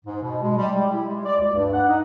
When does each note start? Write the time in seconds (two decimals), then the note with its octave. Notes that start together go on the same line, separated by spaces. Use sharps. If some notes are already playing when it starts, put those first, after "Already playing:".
0.05 G#2
0.22 B2
0.42 G#3
0.57 G3
0.76 G4
0.92 E4
1.06 G#3
1.25 D5
1.40 D2
1.54 G2
1.73 F#5
1.88 D#4